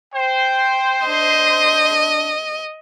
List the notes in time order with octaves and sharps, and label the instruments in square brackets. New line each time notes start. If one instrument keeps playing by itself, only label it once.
[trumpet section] C5 [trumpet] G5
[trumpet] D4 [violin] D#5